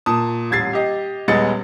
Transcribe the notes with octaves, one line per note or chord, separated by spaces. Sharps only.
A#2 A5 D#6
D#1 A1 G#6 A6 C7
G4 D#5
D#1 G#3 B3 D#5 A6 C#7